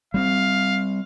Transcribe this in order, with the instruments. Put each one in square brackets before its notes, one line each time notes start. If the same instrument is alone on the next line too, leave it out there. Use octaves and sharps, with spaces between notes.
[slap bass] G3 B3 C4 [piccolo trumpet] F5